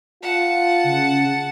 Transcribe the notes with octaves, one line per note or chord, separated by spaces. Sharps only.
F4 F#5 A5
C#3